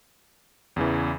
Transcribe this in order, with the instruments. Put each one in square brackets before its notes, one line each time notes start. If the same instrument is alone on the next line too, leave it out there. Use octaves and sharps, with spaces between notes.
[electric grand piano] E2 C#3 E3